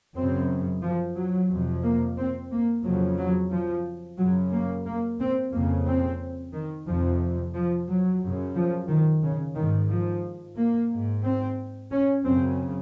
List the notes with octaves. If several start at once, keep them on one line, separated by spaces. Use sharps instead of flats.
F#2 C#3 C4
F3
F#3
F2 C3
A#3
C4
A#3
F2 C#3 F#3
F#3
F3
F#2 C#3 F#3
A#3
A#3
C4
F2 C#3 A#3
C4
D#3
F2 C3 F3
F3
F#3
F#2 C#3
F3
D#3
C#3
G#2 D#3
F3
A#3
G#2
C4
C#4
F#2 C#3 C4